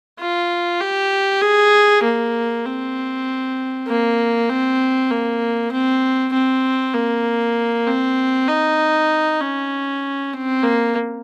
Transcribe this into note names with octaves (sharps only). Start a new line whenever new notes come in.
F4
G4
G#4
A#3
C4
A#3
C4
A#3
C4
C4
A#3
C4
D#4
C#4
C4
A#3